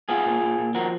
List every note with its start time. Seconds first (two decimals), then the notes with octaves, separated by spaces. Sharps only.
0.09 B3 F4 G#4
0.25 A#2
0.41 A#2
0.58 A#2
0.74 F3 F#4 A#4